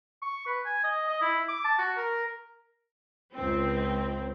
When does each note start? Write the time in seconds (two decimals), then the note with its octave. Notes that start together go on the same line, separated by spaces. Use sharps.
0.22 C#6
0.46 B4
0.65 G#5
0.84 D#5
1.08 D#5
1.22 E4
1.49 D6
1.64 A5
1.79 F#4
1.97 A#4
3.34 C#2 C4